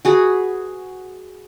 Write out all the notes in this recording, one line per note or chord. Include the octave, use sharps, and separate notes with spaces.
F#4 G#4 B4